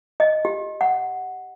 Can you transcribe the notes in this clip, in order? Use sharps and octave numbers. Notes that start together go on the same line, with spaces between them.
D#5
G4
F#5